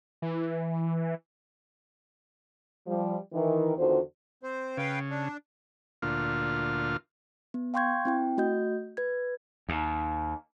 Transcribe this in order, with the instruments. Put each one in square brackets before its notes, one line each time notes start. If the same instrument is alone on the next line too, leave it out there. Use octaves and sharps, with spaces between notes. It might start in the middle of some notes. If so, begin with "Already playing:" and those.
[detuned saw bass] E3
[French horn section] F3 G3
D#3 E3
E2 D3 D#3 F4 F#4 C5
[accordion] C4 C5
[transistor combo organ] C#3 [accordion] B4 F5 G5
[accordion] D4
[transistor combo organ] D2 A#2 F4
[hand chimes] B3
F5 G5 C6 C#6 G6 G#6
C4 E4 G5
A3 F#4 D#5 G6
B4 G#6
[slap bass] D#2